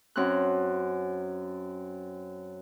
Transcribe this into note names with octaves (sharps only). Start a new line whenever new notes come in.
F#2 C4 C#4 F6 F#6